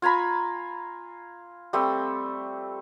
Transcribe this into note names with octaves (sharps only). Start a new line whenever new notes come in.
F4 G#5 A#5 B5
G3 A3 C4